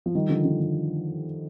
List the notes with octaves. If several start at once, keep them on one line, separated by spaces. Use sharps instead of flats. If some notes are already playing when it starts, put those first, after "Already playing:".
F3
D#3 G3
D3 F3
D3
D#3